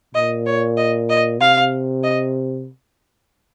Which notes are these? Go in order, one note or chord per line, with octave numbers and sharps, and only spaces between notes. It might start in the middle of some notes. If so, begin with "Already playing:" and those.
A#2 D#5
C#5
D#5
D#5
C3 F5
D#5